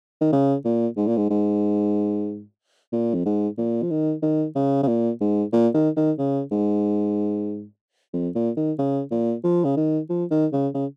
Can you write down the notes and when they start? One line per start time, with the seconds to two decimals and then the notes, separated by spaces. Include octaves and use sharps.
0.21 D#3
0.33 C#3
0.65 A#2
0.97 G#2
1.07 A#2
1.17 G#2
1.30 G#2
2.92 A#2
3.14 F2
3.26 G#2
3.58 A#2
3.83 F3
3.91 D#3
4.23 D#3
4.56 C#3
4.83 C#3
4.88 A#2
5.21 G#2
5.53 A#2
5.74 D#3
5.97 D#3
6.18 C#3
6.52 G#2
8.14 F2
8.35 A#2
8.57 D#3
8.79 C#3
9.11 A#2
9.44 F3
9.65 C#3
9.77 D#3
10.10 F3
10.31 D#3
10.53 C#3
10.74 C#3